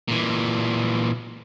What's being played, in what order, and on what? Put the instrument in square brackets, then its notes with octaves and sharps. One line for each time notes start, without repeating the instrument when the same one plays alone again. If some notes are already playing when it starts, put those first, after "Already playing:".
[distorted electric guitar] A#2 E3